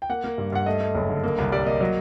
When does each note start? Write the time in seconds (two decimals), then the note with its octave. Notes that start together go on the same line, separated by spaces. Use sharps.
0.02 G5
0.09 A#3 F#5
0.24 A#3
0.38 G2
0.52 G2 F#5
0.66 A3 D#5
0.81 A3
0.95 F#1
1.09 D3
1.24 A#3
1.38 C2
1.52 G3 D5
1.66 A#3 D#5
1.81 F#3